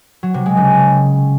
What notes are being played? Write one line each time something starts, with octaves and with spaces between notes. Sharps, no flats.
F#3
C3
G#3
C#3